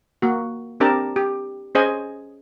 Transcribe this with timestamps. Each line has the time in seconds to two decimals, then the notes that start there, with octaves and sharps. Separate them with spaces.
0.22 A#3 F#4
0.80 C4 D4 G4 A#4 A5
1.16 G4
1.75 C#4 G#4 C5 D#5 G#5